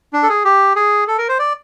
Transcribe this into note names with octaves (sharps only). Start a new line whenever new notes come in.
D4
A4
G#4
G4
G#4
A4
A#4
C5
D5